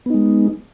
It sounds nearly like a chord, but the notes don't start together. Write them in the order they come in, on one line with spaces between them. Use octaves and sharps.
B3 D#4 G#3